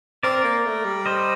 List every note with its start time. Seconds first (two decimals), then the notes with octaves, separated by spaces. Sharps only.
0.23 C4 A#4 D5
0.44 A#3
0.65 A3
0.85 G3
1.06 C5 D#5